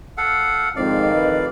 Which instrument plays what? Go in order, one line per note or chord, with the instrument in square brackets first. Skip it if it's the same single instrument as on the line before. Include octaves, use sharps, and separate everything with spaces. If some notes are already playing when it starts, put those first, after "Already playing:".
[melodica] A4 F5 F#5
[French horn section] F2 D#3 [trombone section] G#2 C4 [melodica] D5 F5
[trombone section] A1 B4